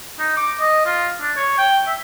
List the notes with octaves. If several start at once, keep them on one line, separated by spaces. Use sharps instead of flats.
D#4
D6
D#5
F4
D4
C#5
G5
E5